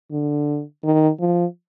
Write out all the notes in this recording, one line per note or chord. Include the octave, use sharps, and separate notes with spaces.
D3
D#3
F3